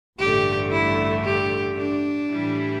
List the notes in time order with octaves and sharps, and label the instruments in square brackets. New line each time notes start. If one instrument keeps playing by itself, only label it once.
[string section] A1 G2 D3 A3 [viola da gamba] G4
[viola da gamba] E4
G4
D4
[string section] A2 E3 G3 E4